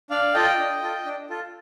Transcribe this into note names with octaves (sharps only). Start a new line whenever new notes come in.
D4 D5 F5
F4 A4 D#5 G5
D4
F4 A4
D4
F4 A4